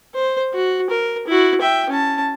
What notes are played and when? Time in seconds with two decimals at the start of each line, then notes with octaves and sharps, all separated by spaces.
0.14 C5
0.54 F#4
0.90 A#4
1.28 E4 F#4
1.61 E5 G5
1.90 C#4 A5